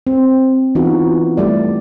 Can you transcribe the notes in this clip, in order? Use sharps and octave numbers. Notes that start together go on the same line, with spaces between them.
C4
E3 B3 D#4 F4 F#4
G3 A3 D5